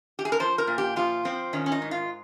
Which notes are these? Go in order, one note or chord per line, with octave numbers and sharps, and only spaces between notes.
G4
G#4
A#4
F3 C5
A#4
A#2
G4
F3 F4
F3 C4
D#3 C#4
C#4
D#4
G#2
F4